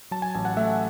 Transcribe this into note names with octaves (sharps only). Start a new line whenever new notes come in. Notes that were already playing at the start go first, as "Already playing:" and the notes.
F#3 A5
G#5
A1 G#5
F#5
A3 E5